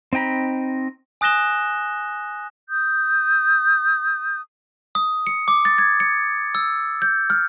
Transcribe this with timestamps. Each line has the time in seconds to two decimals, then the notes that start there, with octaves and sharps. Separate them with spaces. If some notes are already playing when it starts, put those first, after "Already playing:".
0.13 C4 D#4 G5 A#5 B5
1.21 G#5 D#6 F#6 A#6 E7 G7
2.70 D#6 G6
4.95 D#6
5.27 C#7
5.48 D6
5.65 A6
5.78 G#6
6.00 C#7
6.55 E6
7.02 G6
7.30 F6